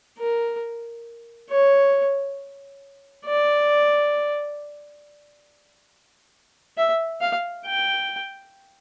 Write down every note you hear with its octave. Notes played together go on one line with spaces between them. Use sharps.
A#4
C#5
D5
E5
F5
G5